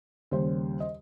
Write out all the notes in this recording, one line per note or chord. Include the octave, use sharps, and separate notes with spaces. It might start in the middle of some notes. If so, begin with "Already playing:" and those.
D#2 C#3 G3 C5
D#5